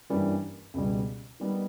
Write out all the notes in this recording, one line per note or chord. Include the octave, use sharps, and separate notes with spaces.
G2 E3 G3 A#3 C#4
C#2 B2 G3
D#3 G3 B3 D#4